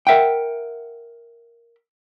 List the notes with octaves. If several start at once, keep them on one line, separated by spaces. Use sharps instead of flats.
A#4 E5 F#5 G5